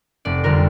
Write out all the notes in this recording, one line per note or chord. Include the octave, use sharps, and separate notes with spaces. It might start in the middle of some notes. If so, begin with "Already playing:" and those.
F1 D5
F2 D3 G3 A#4